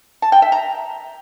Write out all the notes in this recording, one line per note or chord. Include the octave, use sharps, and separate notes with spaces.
A5
G5
E5
A#5